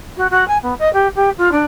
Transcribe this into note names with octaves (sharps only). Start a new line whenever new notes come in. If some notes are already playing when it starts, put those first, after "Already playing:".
F#4
F#4
G#5
B3
D#5
G4
G4
F4
D4